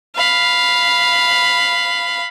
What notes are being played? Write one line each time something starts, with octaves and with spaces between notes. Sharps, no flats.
F5 B5